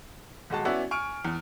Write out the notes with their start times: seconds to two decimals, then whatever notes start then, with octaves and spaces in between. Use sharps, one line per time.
0.50 D#1 G#3 F#4 A5
0.65 B3 C#4 E4 F#4 D5 E5
0.91 G#5 C#6 F6 D7
1.25 E2